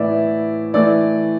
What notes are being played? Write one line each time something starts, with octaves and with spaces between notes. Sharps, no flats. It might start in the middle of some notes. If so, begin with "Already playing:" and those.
Already playing: A2 E3 B3 D5 E5
E3 A3 D5